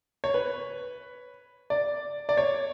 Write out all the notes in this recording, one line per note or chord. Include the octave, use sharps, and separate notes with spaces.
C#5
B4
D5
D5
C#5